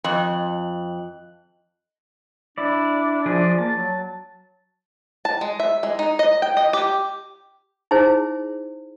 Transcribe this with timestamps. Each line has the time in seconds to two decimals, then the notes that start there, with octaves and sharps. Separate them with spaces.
0.04 F2 D#5 F#6 F#7
2.58 D4 E4 D5
3.26 F3 G#4 D5
3.59 A#3 A5
3.73 F#3
5.25 A5
5.41 G#3
5.60 E5
5.83 G#3
5.99 D#4
6.19 D#5
6.42 G5
6.57 D#5
6.73 G4
7.91 D#4 E4 G#4 C5